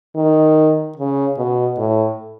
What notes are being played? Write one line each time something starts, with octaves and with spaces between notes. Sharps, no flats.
D#3
C#3
B2
A2